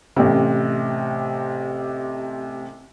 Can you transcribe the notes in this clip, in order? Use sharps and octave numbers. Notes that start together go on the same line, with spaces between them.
A1 C3